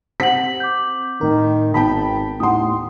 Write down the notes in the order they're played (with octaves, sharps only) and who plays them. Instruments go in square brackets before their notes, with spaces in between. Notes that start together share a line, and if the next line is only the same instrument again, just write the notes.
[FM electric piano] C4 [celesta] G4 F#5 F#7 [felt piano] B6
[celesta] D6 G6
[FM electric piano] A2 A#4 [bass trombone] D#3
[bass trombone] G#1 [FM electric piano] D#3 B3 [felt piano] G5 A5 B5 [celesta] B6
[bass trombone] D#2 [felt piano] A2 C6 [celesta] F#5 G5 D#6